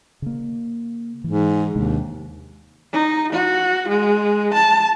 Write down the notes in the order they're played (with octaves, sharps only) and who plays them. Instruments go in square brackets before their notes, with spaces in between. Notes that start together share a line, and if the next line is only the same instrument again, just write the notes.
[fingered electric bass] C#3 A#3
[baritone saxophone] G#2 [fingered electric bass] E3
[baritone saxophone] D#2 [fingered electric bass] C3 G#3 D4
[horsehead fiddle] D#4
F#4
G#3
A5